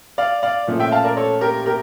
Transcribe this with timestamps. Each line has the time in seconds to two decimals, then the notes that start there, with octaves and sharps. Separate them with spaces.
0.18 D5 F5
0.43 D5 F5
0.67 A#2 F3 A3 C#4
0.80 E5 G5
0.92 F5 A5
1.04 A#4 D5
1.17 A4 C#5
1.41 G4 A#4
1.66 G4 A#4